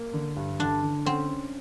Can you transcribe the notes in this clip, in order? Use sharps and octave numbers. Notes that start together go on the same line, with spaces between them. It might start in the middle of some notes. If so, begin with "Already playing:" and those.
Already playing: A#3
D3
G2
D3 D4
D3
C4 C#4
C#4